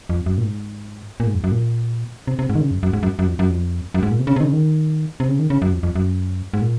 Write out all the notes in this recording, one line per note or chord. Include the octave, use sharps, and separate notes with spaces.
F2
F#2
A#2
G#2
A#2
G#2
F2
F#2
A#2
C3
C3
G#2
D#3
C#3
F#2
F#2
G#2
F#2
F#2
F2
F#2
F2
F#2
G#2
A#2
C3
C#3
C3
D#3
C#3
D#3
C3
C#3
D#3
C#3
F#2
F2
F2
F#2
G#2
A#2